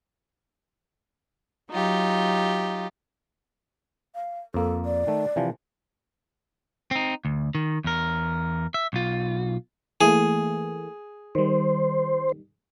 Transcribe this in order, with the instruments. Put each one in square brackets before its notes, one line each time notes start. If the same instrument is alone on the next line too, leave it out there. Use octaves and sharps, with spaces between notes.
[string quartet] F#3 D#4 F4 G4
[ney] F5
[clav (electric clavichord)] F2 A#3 [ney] A4
[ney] D5
[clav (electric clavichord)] D#3 A3
C3 E3 F3
[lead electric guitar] C4 D#4
D2
D#3
E2 A#4
E5
B1 F4
[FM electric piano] E3 A3 A#3 [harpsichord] G#4
[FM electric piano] D#3 G3 [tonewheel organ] C5